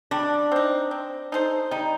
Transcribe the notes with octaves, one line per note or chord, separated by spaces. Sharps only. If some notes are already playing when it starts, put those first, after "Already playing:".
G3 D4
C4 D#4
C4
D#4 A4 C5
G3 D#4